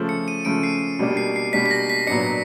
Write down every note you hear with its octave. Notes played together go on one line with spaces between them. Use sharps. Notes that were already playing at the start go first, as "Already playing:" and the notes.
Already playing: C#3 F3 A3
C#7
D#7
C#3 F3 A3 D7
C7
B2 G3 A#3 D4
C7
C7
B2 G3 A#3 D4 B6
B6
A#6
B6
A#2 F#3 B3 D4 C#7